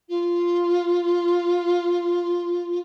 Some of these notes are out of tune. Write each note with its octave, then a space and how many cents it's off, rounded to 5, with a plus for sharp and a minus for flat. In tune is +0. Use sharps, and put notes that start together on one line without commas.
F4 -5